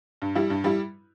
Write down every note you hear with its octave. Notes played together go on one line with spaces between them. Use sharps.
G2
G3 E4
G2
G3 E4